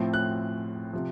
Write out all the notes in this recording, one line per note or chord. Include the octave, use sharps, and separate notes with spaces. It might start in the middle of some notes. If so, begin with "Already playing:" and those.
Already playing: A2 F3 A3 C4
F#6
C3 F3